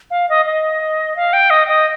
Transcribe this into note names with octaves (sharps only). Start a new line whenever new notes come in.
F5
D#5
D#5
F5
G5
D#5
D#5